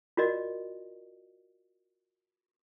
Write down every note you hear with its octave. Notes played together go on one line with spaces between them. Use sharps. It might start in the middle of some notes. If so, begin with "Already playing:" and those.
F4 F#4 A#4 D5 D#5